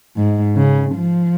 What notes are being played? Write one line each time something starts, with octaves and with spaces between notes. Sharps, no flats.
G#2
C#3
F3